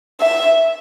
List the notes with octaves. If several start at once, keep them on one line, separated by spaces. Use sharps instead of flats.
E5